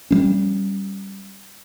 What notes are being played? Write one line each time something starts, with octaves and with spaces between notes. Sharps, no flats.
G3 G#3 C#4